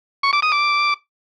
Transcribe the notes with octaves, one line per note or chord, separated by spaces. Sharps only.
C#6
D6
D#6
D6